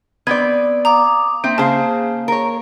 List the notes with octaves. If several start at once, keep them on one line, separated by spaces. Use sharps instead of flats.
B3 C4 D5 G#6
F5 A#5 D6 D#6
A#3 C4 E5
C#3 G#4 C5 F5 A5
A#4 C#5